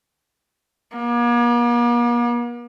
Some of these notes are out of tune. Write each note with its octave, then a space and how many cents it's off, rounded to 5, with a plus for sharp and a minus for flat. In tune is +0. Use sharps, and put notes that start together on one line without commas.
A#3 +45